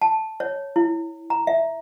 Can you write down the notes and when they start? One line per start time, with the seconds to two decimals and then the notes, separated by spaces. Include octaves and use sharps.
0.02 A5
0.40 C#5
0.76 E4
1.30 A#5
1.47 E5